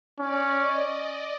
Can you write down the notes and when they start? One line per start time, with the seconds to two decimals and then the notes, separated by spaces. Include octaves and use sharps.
0.18 C#4 D5
0.61 D#5
1.03 D5